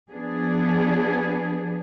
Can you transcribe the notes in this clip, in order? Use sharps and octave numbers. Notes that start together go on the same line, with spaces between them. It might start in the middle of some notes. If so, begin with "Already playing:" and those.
F3 B3 D4 G#4